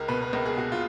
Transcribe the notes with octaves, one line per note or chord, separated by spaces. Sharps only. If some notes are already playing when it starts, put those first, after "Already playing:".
Already playing: C#2 A#4
B2 B4
B4
C#2 A#4
G#4
B2 F#4
F4